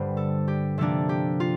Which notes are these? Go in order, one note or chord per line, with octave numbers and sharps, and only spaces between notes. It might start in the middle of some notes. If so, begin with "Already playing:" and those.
Already playing: G2 D3 G3 C5
A4
G4
C3 F3 A#3 D4 A4
G4
F4